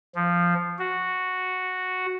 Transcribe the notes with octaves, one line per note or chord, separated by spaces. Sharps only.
F3
F#4